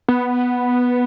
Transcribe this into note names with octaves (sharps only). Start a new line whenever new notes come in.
B3